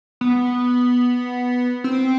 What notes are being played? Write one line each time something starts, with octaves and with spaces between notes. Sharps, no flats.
B3
C4